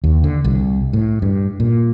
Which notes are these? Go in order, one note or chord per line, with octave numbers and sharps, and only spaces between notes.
D#2
D3
C2
A2
G2
A#2